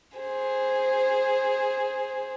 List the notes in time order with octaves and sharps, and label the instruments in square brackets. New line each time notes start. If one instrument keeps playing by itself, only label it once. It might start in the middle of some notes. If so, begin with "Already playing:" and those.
[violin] G#4 C5